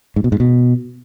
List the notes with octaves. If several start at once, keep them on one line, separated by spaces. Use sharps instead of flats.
G#2
B2
G#2
B2